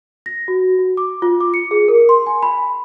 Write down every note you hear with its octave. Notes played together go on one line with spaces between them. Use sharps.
A#6
F#4
F#4
D6
F4
D6
C#7
G#4
A#4
C6
G#5
B5